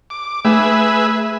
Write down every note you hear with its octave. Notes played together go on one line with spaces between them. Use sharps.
D6
A3 G#4 B4 E5